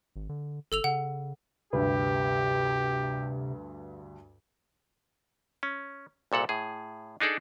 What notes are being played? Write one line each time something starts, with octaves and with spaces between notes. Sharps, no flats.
G#1
D3
G1 A4 E6 F7
C#3 F#5
D2 G2 C3 G4 B4
C#4
C2 A#2 A4 F#5
A2 G#4
D4 D#4 G#4 A4 D5